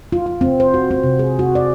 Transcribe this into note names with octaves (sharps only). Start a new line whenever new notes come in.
F4
F4
C4
C5
F#4
C4
C3
G#4
F#4
D5